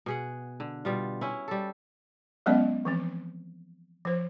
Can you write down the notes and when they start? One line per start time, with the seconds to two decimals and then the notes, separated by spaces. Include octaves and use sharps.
0.06 B2 G#4 F#5
0.60 D3
0.85 B2 G3 F4
1.21 C#4 E4
1.48 G3 A4
2.46 F#3 G#3 B3 C#4 D5 D#5
2.85 E3 F3 C4
4.05 F3 C5